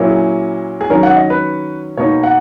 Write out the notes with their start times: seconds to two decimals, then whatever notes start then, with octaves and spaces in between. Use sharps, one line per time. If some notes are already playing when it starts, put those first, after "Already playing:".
Already playing: A#2 F#3 A#3 C#4 E4
0.10 G#4
0.81 G#4
0.90 D#3 F#3 C#4 A#4
1.03 F#5
1.16 D#5
1.30 B4
1.97 B2 A#3 D#4 C#5
2.23 F#5